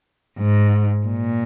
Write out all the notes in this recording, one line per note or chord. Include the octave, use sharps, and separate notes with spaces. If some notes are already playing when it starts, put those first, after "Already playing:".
G#2
A#2